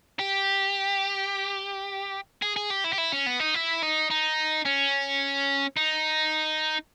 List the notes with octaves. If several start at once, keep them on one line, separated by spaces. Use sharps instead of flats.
G4
G#4
G#4
G4
E4
G4
E4
C#4
B3
D#4
E4
D#4
D#4
C#4
D#4